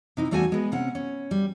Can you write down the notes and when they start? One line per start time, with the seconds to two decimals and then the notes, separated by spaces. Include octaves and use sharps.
0.17 C3 D#4 E4
0.31 E2 G3 A3 F#4 F#5 G#5
0.52 G#3 B3
0.72 C3 C#4 F#5
0.95 C#4
1.31 G3